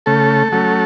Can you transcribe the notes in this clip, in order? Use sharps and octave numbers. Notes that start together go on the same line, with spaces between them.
C#3 A3 A4
F#3 A3 C#4